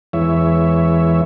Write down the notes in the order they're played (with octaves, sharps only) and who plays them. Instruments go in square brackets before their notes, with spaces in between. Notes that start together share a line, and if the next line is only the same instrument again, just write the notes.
[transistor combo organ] E2 E3 G#3 C#5 E5